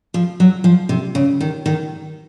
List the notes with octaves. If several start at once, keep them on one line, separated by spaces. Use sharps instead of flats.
F3
F#3
F3
C3
C#3
D#3
D#3